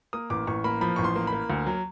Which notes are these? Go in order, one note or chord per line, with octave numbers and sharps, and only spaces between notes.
A#3 D#6
A1 D6
A1 C#6
A#3 B5
F3 B5
A1 C#6
C6
A#3
B5
A#3
D2
F#3